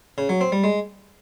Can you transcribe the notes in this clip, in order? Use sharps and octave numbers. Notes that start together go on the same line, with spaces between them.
C#3
F#3
C4
G3
G#3